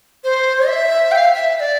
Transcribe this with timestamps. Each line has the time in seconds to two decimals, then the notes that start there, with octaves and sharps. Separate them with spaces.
0.24 C5
0.68 E5
1.12 G5
1.16 F5
1.34 E5
1.56 E5
1.60 D5